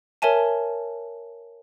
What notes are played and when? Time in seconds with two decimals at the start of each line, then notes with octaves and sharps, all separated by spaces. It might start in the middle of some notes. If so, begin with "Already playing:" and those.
0.22 A#4 C#5 E5 G#5 A5